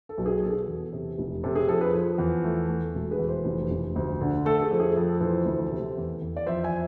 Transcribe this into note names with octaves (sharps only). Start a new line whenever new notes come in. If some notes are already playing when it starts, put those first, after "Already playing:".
A4
B1
G#4
B2 A4
G#4
A4
E2
C3
F1
C3 A4
G#4
F2 A4
G#4 B4
F3
E2
A3
A3
E1 A4
G#4 B4
E2
A4 C5
F1
F1
D2
D3
A3 A4
A4
G#4
F2
G#4
F2 A4
E3 A4 C5
D2
C3
E2
E2
D5
F2 C5 E5
E5 G#5